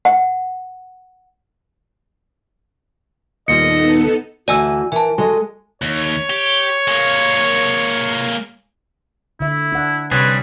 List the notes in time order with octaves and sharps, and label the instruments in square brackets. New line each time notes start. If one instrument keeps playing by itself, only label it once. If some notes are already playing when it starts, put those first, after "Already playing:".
[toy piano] F#5
[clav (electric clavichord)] D#2 A#2 G3 [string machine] B3 D#4 A4 [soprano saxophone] D#5 [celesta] C#7
[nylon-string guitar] D2 E3 D#5 [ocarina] F#4 [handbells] D5 G#5 E6
[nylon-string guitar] E3 [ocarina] A#4 [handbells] G#5 A5
[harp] G#3 [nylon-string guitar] F#4 D#5 [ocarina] A4
[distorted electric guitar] D#2 [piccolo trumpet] C#5
[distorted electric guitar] G4
G#3 A#3
[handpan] D3 E5 [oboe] E4
[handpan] D4 F#5
[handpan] C3 C#5 [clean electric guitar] G3 G#4 [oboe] B4